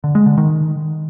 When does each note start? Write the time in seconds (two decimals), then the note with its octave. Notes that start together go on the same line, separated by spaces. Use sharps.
0.04 D3
0.15 G#3
0.26 D3
0.38 D#3